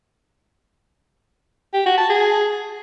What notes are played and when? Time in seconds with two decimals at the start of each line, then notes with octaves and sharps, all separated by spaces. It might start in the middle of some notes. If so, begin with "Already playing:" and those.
1.74 G4
1.86 F#4
1.98 A5
2.09 G#4